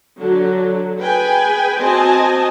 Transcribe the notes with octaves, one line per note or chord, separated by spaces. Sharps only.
D3 F#3
G#4 B4 G5 G#5
C4 F#4 D#5 G#5 A5